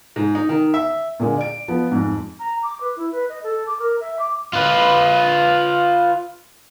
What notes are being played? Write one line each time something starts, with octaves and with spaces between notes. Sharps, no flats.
G#2
D#4
D#3
E5
A#2 D3 G#3
D5 D7
F3 B3
F2 G#2
A#5
D6
B4
E4
B4
D#5
A4
D6
A#4
E5
D6
F4 B4